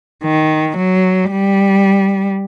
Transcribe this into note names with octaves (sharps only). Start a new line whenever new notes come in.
D#3
F#3
G3